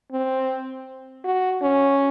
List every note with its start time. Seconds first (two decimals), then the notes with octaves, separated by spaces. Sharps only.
0.12 C4
1.24 F#4
1.62 C#4